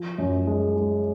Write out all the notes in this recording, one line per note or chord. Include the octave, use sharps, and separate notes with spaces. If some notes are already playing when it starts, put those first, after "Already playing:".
Already playing: F3
F#2
G#3
G#3